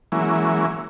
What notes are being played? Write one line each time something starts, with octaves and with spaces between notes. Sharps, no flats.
E3 F#3 G#3 A#3 C#4 E4